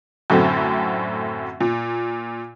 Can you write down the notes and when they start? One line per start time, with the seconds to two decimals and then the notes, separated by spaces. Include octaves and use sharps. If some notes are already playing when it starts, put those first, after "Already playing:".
0.30 F#2 A2 D3 F#3 C4
1.61 A#2